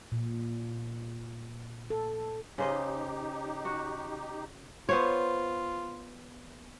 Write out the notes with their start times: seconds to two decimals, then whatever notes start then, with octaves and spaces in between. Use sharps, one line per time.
0.12 A#2
1.90 A4
2.58 C#3 D#4 G4 C5 D#5
3.65 F#4
4.89 B3 F4 C5 C#5